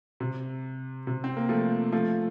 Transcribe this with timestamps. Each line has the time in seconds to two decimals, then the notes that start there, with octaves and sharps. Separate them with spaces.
0.20 C3
1.07 C3
1.24 C4
1.37 A#3
1.49 F3 A3
1.92 F3 A3